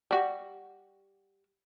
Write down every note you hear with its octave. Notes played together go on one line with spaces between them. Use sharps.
G3 F#4